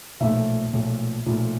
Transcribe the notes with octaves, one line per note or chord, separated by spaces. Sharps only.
B1 A#2 F3 A3 E5
B1 A#2 F3 A3
B1 A#2 F3 A3